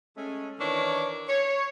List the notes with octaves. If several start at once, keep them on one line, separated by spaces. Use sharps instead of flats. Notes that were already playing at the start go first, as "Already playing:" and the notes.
G#3 A3 C#4
D#3 E3 D4 A#4 C#5
C#5